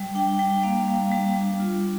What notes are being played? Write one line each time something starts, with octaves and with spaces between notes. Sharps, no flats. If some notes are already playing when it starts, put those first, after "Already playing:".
Already playing: G3
D4 G5
G3 G5
A#3 F5
G3
G3
D4
F4